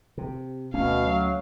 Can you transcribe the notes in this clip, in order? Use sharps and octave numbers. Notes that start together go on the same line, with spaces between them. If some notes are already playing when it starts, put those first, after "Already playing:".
C3
D2 B2 A3 C#4 F5
F#3